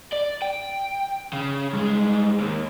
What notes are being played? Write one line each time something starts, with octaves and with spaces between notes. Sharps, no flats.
D5
G5
C#3
G2 G#3
D#2